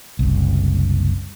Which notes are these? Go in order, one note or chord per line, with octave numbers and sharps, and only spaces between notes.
F#1 C2